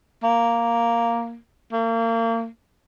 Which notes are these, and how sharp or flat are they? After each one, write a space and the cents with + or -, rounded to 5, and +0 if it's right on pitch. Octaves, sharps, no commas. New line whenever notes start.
A#3 +0
A#3 -35